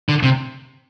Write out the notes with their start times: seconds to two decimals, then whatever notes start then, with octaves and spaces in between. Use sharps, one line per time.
0.09 D3
0.23 C3